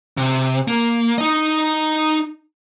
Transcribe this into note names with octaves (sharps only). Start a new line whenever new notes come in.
C3
A#3
D#4 D#5